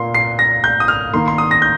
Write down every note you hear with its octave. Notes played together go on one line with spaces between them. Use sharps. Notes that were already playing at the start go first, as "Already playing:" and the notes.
Already playing: A#2 A#3 C6
C7
A#6
G6
D#6
F6
D#3 A#3 C6
C6
D#6
A#6
G6